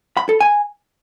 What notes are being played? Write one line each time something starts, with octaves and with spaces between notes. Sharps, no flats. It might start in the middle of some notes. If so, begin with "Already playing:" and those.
B5
A4
G#5